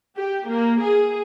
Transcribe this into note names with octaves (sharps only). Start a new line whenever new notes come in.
G4
A#3
G#4